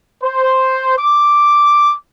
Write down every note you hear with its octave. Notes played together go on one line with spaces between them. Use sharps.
C5
D6